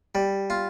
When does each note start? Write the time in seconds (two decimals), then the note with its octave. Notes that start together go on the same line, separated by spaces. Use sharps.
0.15 G3
0.50 F4